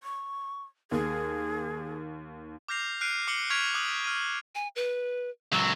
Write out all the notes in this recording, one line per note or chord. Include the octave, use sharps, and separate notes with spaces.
C#6
D#2 G#4
D6 F6 G6 A#6 C7 F7
F6 F#6 C7 D7 D#7
D6 C7 C#7 F#7 G7
C#6 F6 G#6 B6 D7 F7
D6 D#6 F#6 C#7 D#7 F#7
F6 B6 D#7
G#5
B4
C#2 F#3 E6